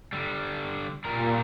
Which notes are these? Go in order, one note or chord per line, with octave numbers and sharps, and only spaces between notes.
D3 G3
A#2 G3 A#4